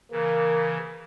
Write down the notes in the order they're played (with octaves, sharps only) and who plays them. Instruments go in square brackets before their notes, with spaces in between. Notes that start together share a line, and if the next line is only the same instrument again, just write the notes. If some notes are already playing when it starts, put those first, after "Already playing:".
[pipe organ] C#3 E3 [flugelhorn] A#3 [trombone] A#4